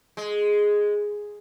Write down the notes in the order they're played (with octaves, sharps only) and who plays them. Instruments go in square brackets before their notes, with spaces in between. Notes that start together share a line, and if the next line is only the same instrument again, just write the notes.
[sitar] G#3